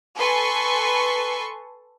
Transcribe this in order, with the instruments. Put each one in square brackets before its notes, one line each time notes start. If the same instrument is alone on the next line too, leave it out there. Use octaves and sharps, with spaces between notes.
[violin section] A4 B4 G#5 C6 C#6